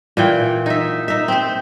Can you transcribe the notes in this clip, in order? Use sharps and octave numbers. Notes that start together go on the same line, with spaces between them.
A#2 E3 G5
D#4 E5
D#4 E5
C4 C5